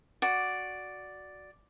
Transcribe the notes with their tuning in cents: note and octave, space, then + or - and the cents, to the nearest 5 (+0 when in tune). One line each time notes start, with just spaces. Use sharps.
F#4 +0 D5 +0